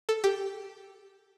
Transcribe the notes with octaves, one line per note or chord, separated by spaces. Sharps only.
A4
G4